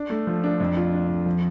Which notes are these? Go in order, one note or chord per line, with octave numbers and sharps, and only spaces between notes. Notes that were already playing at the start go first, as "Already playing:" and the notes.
Already playing: D4
A3
F3
D4
F2
F4
D4
F2
F3